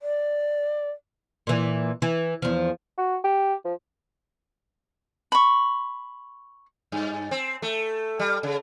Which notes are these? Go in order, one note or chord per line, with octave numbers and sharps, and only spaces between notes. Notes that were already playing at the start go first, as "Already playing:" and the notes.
D5
A#2 E3
E3
E2 F3
F#4
G4
F3
B5 C#6
G2
C4
A3
G3
C#3